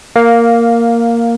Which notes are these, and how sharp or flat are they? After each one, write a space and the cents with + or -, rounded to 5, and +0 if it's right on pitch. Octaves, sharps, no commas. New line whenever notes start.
A#3 -5 F5 +10